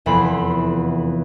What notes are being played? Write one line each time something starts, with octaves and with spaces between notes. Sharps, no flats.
F1 E2 A4 B5 C6